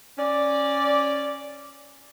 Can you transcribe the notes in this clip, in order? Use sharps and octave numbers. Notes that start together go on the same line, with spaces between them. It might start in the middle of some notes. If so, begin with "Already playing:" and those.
C#4 D5